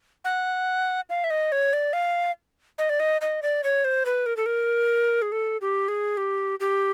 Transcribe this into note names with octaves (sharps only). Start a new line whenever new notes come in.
F#5
F5
E5
D#5
C#5
D5
F5
D#5
D5
D#5
D#5
D5
C#5
C5
B4
A#4
A4
A#4
G#4
A4
G4
G#4
G4
G4